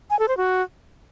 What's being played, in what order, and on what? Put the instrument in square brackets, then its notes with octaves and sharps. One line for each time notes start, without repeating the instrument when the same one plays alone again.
[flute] G#5
A4
C5
F#4